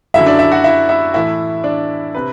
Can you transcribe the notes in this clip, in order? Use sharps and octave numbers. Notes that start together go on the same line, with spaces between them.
F#2 D3 F#3 E4 E5
D4 D5
E4 E5
F#4 F#5
E4 E5
E4 E5
A2 E3 E4 E5
D4 D5
C3 B4